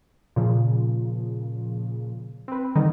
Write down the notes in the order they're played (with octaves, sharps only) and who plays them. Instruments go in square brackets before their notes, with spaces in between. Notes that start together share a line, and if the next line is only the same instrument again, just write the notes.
[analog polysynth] A#2 C#3 F3
C4 B4
D3 D#3 G3 D#4